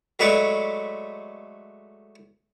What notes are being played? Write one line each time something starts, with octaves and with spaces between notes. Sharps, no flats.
F#3 G#3 A3 B4 C#5 D5